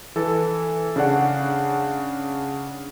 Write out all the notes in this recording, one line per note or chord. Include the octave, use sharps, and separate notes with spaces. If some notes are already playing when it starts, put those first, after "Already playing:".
E3 A4
C#3 D4 F#5